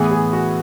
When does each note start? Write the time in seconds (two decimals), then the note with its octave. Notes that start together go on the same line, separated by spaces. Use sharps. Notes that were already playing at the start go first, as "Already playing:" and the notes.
Already playing: A2 E3 B3 G#4
0.11 G#4
0.33 F#4